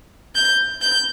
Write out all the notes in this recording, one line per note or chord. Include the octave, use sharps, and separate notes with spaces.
G6
G6